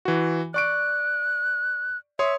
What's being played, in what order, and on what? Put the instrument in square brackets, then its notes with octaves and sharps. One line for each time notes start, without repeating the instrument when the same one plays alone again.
[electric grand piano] E3 F#4
[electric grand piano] D5 C#6 D7 [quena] F#6
[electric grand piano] C#5 C6 D#6 [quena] E5